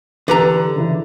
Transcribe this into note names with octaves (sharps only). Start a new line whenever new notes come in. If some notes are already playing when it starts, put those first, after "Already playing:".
D3 E3 G4 A4 B4 A#5
C#3 E3 E4